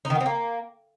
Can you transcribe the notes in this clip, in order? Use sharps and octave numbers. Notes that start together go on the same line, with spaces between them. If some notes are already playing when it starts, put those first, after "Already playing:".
D#4
D#3
B3
C4
A#3